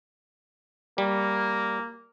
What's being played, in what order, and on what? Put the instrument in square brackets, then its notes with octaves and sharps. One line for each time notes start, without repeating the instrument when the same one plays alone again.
[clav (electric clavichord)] G3 [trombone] A#3